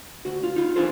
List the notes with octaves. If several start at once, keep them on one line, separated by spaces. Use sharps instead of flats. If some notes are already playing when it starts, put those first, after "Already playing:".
D2 F#4
F4
D#4 F4
E3 D4 F4 G#4 A4 C5